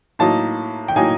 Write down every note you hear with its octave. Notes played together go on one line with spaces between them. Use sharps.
A2 F#3 A#3 D#4 A5
G5
A2 F#3 A#3 D#4 G#5